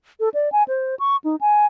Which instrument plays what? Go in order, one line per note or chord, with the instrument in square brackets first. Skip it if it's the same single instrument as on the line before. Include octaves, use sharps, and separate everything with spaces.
[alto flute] A4
D5
G#5
C5
C#6
D#4
G#5